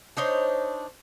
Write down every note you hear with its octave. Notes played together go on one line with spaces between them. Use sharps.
D4 D#4 C5 C#5